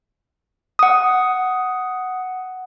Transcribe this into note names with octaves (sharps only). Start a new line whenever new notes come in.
F#5 D#6